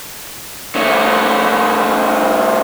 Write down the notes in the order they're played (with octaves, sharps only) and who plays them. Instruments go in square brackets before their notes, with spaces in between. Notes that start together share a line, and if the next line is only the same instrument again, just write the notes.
[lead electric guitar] C#3 A3